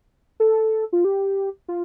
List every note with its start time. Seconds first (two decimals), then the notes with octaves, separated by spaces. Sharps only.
0.40 A4
0.93 F4
1.05 G4
1.68 F4